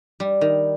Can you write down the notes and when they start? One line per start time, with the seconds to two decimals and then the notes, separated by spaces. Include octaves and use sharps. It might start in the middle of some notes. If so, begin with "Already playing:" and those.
0.20 G3
0.41 D#3